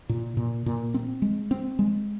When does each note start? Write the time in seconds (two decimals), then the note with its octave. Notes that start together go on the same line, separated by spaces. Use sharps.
0.09 A#2
0.37 A#2
0.66 A#2
0.94 C4
1.22 G#3
1.51 C4
1.79 G#3